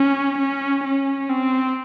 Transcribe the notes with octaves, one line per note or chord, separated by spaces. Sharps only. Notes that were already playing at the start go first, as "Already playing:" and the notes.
Already playing: C#4
C#4
C#4
C4